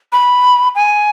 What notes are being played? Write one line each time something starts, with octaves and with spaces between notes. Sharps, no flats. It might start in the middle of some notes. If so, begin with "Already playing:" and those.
B5
G#5